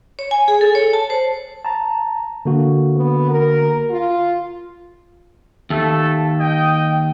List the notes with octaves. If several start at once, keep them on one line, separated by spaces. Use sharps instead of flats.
C#5
G#5
G#4
A4
C#5
A5
C5
A5 A#5
D3 A#3 F#4
B3
A#4
F4
D#2 A3 A4 E5
D#5 G5